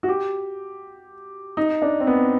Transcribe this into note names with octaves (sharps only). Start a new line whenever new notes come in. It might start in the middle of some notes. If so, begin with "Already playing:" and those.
F#4
G4
D#4
D4
C4
B3